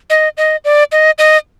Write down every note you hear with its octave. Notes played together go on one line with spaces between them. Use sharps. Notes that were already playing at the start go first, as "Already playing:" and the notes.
D#5
D#5
D5
D#5
D#5